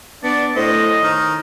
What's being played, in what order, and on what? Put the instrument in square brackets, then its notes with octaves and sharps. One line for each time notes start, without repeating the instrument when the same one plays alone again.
[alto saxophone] B3 [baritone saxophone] D4 [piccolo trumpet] D5
[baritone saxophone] A2 [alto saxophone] C5 [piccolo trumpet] D#5
[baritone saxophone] D#3